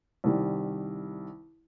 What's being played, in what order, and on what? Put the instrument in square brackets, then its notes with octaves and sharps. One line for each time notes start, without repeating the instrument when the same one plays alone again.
[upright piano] C2 D#3 G3